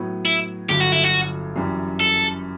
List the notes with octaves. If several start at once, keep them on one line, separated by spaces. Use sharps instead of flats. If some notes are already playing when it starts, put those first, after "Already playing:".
Already playing: A2 F#3 B3
E4
G1 G2 D3 F#3 G4
F#4
E4
F#4
F#2 E3 G3
A4